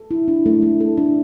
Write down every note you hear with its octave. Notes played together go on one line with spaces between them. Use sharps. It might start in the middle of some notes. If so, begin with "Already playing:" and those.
Already playing: A4
E4
D4
A3
A3
A4
D4